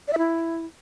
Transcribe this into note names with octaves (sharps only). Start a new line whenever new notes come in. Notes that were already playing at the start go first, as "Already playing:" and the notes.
D5
E5
E4